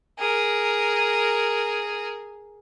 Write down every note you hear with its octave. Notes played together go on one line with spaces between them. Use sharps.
G#4 A#4